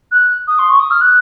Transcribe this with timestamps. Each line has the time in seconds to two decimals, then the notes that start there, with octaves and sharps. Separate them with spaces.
0.11 F#6
0.47 D#6
0.58 C6
0.69 C#6
0.79 D#6
0.90 F6
1.01 F#6